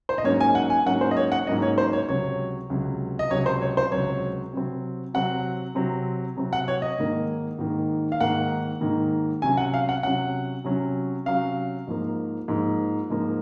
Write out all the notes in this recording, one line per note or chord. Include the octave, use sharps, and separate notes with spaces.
C5
D#5
G#2 F#3 A#3 C#4 C#5
G#5
F#5
G#5
G#2 F#3 A#3 C#4 F#5
C5
D#5
C#5
F#5
G#2 F#3 A#3 C#4 D#5
C#5
C5
C#5
C#2 C3 F#3 C#5
C#2 C3 F#3
D#5
C#2 C3 F#3 C#5
C5
C#5
C5
C#2 C3 F#3 C#5
C3 F#3 C4
C3 F#3 C4 F#5
C3 F#3 C4
C3 F#3 C4
F#5
C#5
D#5
G#2 D#3 A#3
G#2 D#3 A#3
F5
G#2 D#3 A#3 F#5
G#2 D#3 A#3
C3 F#3 C#4 G#5
F#5
F5
F#5
C3 F#3 C#4 F#5
C3 F#3 C#4
C3 F#3 C#4 F5
G#2 F3 A#3
G#2 F3 A#3
G#2 F3 A#3